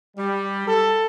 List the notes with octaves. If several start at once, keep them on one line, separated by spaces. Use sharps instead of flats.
G3
A4